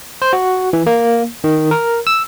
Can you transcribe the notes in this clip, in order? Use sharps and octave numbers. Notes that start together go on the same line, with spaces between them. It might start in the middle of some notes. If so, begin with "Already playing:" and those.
C5
F#4
E3
A#3
D#3
A#4
E6